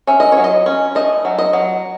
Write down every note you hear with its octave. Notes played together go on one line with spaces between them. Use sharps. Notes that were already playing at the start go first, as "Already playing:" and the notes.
C#4 E5
D#5
C#5
F#3
D#5
C#4
A3 D#5
F#3
D#5
F#3